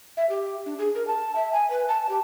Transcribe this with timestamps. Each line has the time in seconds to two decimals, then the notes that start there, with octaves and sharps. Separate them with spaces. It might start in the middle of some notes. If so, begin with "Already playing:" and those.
0.17 E5
0.29 G4
0.66 D4
0.79 G#4
0.95 A#4
1.07 A5
1.36 E5
1.53 G#5
1.70 B4
1.88 A5
2.09 G4